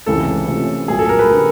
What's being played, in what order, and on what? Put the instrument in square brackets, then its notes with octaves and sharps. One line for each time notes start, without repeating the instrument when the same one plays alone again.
[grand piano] C#2 C3 E3 [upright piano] A4
[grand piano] C3 E3 A3 C#4 F4
[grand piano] C2 A#2 F#3 [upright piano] G#4
[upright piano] A4
A#4
B4
[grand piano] D3 G3